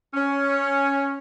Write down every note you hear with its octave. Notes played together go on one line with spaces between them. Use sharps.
C#4